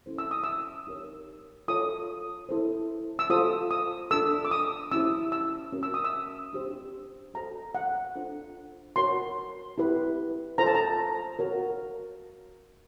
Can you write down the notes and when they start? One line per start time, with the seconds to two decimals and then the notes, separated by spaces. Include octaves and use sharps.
0.06 C#4 E4 A4 C5
0.18 E6
0.31 D#6
0.44 E6
0.87 D#4 G4 A#4 C#5
1.68 F4 A4 C#5 D#6
2.49 E4 A4 C5
3.19 E6
3.30 F4 A4 C5 D#6
3.71 D#6
4.11 D4 F4 A4 E6
4.45 D6
4.51 D#6
4.91 C#4 E4 G4 C5 E6
5.32 E6
5.72 C#4 F#4 A#4
5.83 E6
5.94 D#6
6.04 E6
6.53 D4 G4 C5
7.34 F#4 A4 C5 A#5
7.75 F#5
8.15 D4 F4 A4 C5
8.96 F#4 A#4 C#5 C6
9.78 E4 G4 B4
10.58 F4 A4 C5 A#5
10.66 A5
10.75 A#5
11.39 F#4 A#4 C#5